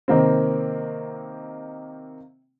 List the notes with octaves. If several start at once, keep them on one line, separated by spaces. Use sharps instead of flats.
C3 D#3 A#3 C4